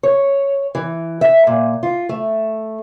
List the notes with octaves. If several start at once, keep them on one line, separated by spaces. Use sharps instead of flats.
C#5
E3
E5
A#2
F4
A3